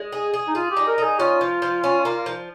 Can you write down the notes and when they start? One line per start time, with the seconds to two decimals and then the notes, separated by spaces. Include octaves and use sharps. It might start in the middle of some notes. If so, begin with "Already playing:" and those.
Already playing: G#3
0.12 G#4
0.34 G#4
0.48 D#4
0.55 F4 G#4
0.71 G4
0.77 D#4
0.87 A#4
0.98 D#4
1.03 G#4
1.19 C#4 F4
1.41 F3
1.62 F3
1.84 C#4
2.05 A#3
2.26 F3